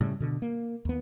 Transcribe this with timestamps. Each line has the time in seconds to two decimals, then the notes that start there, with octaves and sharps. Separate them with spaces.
0.01 A2 C#3 G3
0.20 B2 D3
0.42 A#3
0.85 D#2 B3